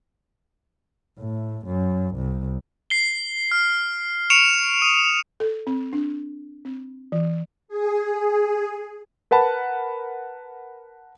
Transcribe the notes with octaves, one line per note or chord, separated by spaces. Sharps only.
A2
F#2
C2
C7 G7
F6
C#6 C#7 D7 E7 F7
D#6 D#7
A4
C4
D4
C4
E3
G#4
A#4 B4 F#5 A5 B5